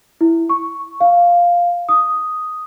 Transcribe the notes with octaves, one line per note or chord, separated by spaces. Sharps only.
E4
C#6
F5
D#6